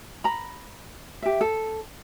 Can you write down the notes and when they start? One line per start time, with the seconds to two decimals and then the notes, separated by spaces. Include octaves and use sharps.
0.24 A#5 B5
1.22 G4 E5
1.41 A4